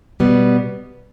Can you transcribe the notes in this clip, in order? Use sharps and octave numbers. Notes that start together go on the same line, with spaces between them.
B2 G3 B3